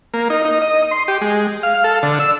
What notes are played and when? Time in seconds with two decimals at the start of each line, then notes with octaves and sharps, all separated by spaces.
0.14 A#3
0.30 D#4
0.45 D#4
0.62 D#5
0.91 C6
1.08 G4
1.21 G#3
1.63 F5
1.84 A4
2.03 D3
2.20 E6